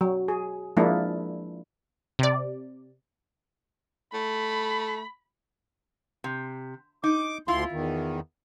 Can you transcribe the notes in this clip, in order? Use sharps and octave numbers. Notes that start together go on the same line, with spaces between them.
F#3
G#4
F3 G#3 A#3 D4 E4
C3 D5
A3 B5
C3
D#4 D6
D2 E4 F4 C6
E2 D#3